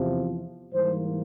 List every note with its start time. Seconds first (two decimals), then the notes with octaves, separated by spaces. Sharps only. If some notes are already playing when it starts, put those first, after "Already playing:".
Already playing: E2 C3 F3
0.73 G#2 E3 G3 A#3 C5